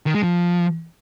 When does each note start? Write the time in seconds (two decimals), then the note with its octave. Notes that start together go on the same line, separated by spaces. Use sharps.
0.06 D#3
0.15 G#3
0.23 F3